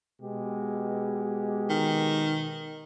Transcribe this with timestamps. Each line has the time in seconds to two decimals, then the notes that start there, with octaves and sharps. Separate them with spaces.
0.20 B2 G#3 G4
1.70 D#3